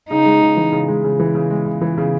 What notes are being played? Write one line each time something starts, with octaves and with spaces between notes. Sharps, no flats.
C#3 D#4
G#3
C#3
E3
C#3
G#3
C#3
E3
C#3
G#3
C#3
E3
C#3